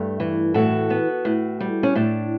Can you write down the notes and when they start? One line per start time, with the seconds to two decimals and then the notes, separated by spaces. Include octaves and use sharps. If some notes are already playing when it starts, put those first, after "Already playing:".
Already playing: G2 A3 G4
0.20 E3
0.54 A2 F#4 A4
0.90 B3
1.25 A2
1.60 G3
1.83 C#4
1.95 A2 D4